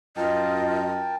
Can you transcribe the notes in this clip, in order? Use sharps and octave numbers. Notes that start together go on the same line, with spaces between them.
F#2 F4 A#4 D#5 G5 A5